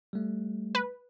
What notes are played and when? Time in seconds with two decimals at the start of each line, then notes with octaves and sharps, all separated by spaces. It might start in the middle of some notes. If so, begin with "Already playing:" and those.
0.13 G3 A3
0.75 B4